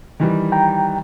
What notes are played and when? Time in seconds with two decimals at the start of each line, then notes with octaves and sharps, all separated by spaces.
0.20 D#3 E3 G3
0.52 G5 A#5